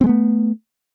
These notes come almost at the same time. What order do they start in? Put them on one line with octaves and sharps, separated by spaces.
C4 G#3 B3 A3